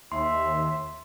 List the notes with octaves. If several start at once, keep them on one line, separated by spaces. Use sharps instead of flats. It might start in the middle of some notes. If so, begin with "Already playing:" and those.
D#2 E5 C6